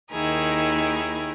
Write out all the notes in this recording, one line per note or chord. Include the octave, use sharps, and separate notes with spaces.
D#2 D#3 E4 G#4 A#4